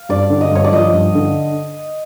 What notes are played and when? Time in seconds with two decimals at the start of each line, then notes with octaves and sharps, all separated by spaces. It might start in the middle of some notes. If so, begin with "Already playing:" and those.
Already playing: F5
0.09 G2 D5
0.30 D3
0.41 D#5
0.51 G2 C#5
0.64 D5
0.72 F3 D#5
0.93 G2
1.15 D3